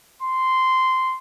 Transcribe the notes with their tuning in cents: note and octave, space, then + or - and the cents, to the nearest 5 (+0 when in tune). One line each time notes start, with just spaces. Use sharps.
C6 -10